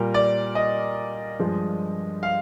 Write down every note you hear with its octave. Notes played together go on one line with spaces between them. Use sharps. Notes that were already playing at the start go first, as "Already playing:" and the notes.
Already playing: A#2 G3 A#3 A#4
D5
D#5
G2 F3 G#3
F5